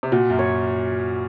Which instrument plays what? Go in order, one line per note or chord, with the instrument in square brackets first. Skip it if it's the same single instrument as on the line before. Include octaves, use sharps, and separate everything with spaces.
[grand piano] C3
[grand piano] A#2 [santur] F#4
[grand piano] F#2
[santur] C#5